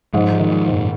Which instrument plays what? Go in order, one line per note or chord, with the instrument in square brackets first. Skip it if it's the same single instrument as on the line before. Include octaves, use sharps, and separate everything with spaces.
[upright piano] G#2 [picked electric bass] F3 G#3
[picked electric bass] F3 G#3
[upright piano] D#3
[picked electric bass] F3 G#3
[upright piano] G#2
[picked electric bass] F#2 A#2